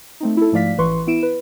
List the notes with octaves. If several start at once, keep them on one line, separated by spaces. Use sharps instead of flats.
A3 C4 D#4
E4 A4
G#2 F3 A3 D5 F5 B6
A1 E3 B4 C6 C#6
B3 E4 D7 E7
B4